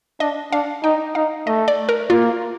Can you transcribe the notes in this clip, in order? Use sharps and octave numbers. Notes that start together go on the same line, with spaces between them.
D4 D#5
D4 F5
D#4 G5
D#4 F5
A3 D#5
D5
A#4
A#3 F4